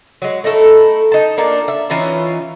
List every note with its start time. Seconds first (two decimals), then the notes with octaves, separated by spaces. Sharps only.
0.22 F#3 G#3
0.44 A3 D#4 E4 A4
1.12 D#4 A5
1.37 A#3 D4 F4 A4
1.68 E5
1.90 E3 C#4 D#4 F4